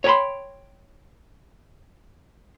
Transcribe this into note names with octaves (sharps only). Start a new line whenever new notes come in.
C#5 G5 G#5 B5 C6